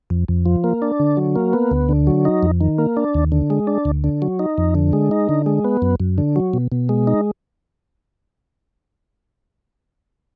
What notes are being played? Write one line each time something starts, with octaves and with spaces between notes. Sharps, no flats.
F2
F2
F3
A#3
D4
D3
F#3
A#3
B3
D2
D3
F#3
D#4
F2
D#3
A#3
D4
D#2
D3
G#3
D4
D2
D3
F#3
D#4
F2
D3
G#3
D#4
D3
G#3
B3
F#2
F#2
D3
F#3
B2
B2
G#3
D#4